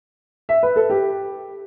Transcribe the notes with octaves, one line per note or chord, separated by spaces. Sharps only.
E5
B4
A4
G4